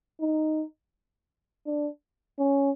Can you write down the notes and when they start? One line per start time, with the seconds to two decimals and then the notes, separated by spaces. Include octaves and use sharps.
0.20 D#4
1.66 D4
2.38 C#4